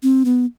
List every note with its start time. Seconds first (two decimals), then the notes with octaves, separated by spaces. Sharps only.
0.03 C4
0.25 B3